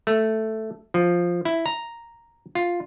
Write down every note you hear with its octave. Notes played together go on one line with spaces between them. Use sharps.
A3
F3
E4
A#5
F4